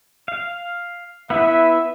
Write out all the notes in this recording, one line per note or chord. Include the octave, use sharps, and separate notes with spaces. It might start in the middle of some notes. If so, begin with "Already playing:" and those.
F5
B3 E4 B4 E5